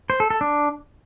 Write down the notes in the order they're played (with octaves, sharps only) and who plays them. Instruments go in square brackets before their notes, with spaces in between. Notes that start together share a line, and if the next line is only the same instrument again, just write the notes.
[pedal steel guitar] C5
A4
A4
D4